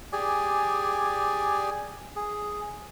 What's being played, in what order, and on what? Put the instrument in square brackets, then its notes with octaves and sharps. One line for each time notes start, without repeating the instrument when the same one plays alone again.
[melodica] G4 G#4 D5 G#5
G#4